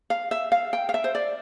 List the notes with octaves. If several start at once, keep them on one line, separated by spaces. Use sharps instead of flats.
F5
E5
F5
G5
F5
E5
C5
D5